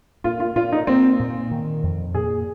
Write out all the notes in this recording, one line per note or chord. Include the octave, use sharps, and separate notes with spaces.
A#2 F4
F4
A#2 F4
D#4
A#3 C4
A#2
D#3
F2
A#2 G#4